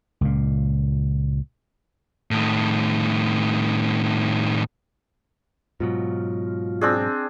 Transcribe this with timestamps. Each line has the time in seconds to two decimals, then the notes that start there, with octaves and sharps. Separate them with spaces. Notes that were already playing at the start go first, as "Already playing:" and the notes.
0.21 C#2 A#2
2.31 A2 D#3
5.80 G#2 B2 F#3 F4
6.81 C4 D4 G#4